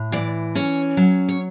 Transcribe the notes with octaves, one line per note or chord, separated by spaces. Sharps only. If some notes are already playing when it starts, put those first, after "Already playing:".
Already playing: A2
E3 D5
C#4 C#5
F#3
C#5